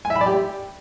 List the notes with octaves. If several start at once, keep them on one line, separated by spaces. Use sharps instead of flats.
G#5
E5
B5
D5
G4